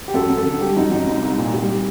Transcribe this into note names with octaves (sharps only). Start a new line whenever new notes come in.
G4
F#2 A4
F#2
A4
D3
G3 G4
F#2 D#4
F#2 D#4
C2
C2
A#2
G3